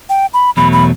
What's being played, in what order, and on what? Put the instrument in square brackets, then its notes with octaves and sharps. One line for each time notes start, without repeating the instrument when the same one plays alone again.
[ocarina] G5
B5
[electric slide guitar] E2 B2 F#3 A3 [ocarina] B5
[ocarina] B5